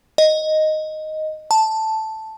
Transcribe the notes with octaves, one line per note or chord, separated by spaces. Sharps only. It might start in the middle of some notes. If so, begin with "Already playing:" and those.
D#5
A5